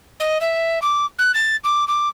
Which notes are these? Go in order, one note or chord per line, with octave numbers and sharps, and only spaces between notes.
D#5
E5
D6
F#6
A6
D6
D6